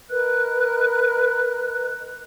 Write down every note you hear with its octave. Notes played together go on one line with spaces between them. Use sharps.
A#4 B4 D#5 F#6